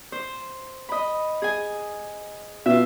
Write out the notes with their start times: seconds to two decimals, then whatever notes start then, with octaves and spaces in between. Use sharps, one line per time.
0.12 C5
0.89 D#5 B5
1.42 G#4 G#5
2.66 B2 F4 E5